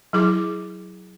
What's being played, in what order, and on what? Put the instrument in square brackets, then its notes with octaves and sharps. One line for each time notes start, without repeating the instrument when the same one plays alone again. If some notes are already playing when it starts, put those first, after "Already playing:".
[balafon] F#3 E4 G#4 D6